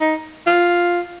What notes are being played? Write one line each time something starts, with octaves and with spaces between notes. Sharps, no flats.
D#4
F4